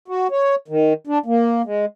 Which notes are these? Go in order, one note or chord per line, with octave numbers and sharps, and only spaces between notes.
F#4
C#5
D#3
D4
A#3
G#3